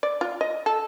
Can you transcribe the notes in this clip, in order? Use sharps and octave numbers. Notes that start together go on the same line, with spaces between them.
D5
F4
D#5
A4